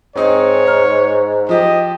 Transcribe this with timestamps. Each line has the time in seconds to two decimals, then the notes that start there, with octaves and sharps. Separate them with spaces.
0.16 G#2 C4 D#4 G#4 C#5
0.66 A#5 F6
1.49 F3 G4 D#5